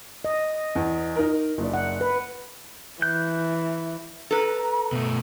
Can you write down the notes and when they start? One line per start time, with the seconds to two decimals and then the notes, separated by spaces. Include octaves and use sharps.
0.25 D#5
0.75 E2
1.16 D#4 A#4
1.58 F#1 D4
1.74 F#5
2.01 B4
3.02 E3 F#6 G6
4.31 A4 B4 A#5
4.93 B2 A3